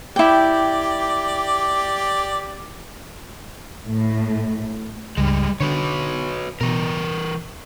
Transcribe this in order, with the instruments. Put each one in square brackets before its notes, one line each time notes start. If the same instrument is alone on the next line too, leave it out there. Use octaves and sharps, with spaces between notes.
[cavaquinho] E4 G5 [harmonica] G4 D5
[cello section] A2
[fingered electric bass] C#2 G2 [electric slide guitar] G3 G#3
[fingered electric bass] D3 [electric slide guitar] F#4 B4 C#5
[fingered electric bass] B2 [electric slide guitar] E3 A#4